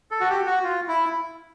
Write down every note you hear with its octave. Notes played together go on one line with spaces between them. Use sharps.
A4
F#4
G4
F#4
F4
E4